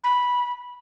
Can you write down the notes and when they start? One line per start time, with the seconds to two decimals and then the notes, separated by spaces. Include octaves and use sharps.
0.04 B5